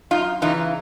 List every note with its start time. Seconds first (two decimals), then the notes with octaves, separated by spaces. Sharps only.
0.11 F#2 D#4 F4
0.42 C#3 E3 D#4 F4